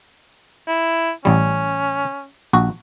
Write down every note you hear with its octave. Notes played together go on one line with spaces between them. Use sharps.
E4
A1 G3 C#4
A#1 F#4